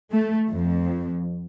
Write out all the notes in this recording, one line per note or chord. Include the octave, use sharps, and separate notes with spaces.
A3
F2